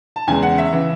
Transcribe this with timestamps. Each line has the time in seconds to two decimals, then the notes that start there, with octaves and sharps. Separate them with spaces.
0.16 A5
0.27 E2 C#3 E3 G#3 G#5
0.43 F#5
0.58 E5
0.73 C#3 E3